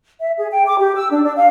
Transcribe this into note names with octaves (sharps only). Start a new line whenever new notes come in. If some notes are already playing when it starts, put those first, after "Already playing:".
E5
G#4
G5
D6
G4
E6
D4
D4
F5